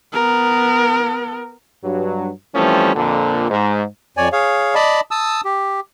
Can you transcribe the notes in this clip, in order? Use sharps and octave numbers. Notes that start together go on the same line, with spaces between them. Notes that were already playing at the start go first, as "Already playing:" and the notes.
B3 A#4
G2 F#3
E3 F3 G3 A3 C4 C#4
F2 A#2 D3
G#2
F2 C#5 D5 G#5
G#4 C#5 F5
D5 D#5 A5 B5
A5 D#6 E6
G4